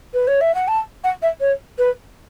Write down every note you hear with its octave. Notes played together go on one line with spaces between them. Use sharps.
B4
C#5
E5
F#5
A5
F#5
E5
C#5
B4